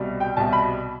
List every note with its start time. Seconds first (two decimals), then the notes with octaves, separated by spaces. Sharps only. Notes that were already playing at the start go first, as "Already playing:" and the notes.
Already playing: C2 B2 G3
0.20 G5
0.37 C2 B2 G3 A5
0.53 B5